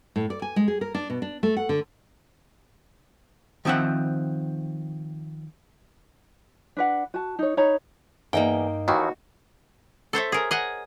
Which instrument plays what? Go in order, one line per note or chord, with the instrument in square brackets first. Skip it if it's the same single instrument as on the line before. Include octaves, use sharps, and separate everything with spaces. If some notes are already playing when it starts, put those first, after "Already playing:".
[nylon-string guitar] A2
D5
G#5
G#3
G#4
A#4
D4
B2
D4
A3
F#5
D3
[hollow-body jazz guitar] D#3 F3 C4 E5 F#5
[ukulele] D4 B4 F#5
F#4 A5
D#4 C#5
D#4 C#5 A#5 B5
[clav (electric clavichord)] E2 [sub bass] G2 [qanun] A#3 D#4 G5
[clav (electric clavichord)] D#2 D#3 E3 [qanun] F#4
[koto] A4 C5 C#5 E5
G#4 A#4
G#4 D#5 F#5